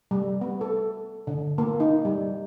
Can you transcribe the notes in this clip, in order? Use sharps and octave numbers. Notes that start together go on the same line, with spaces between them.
G3
B3
A4
D3
A#3
D#4
G3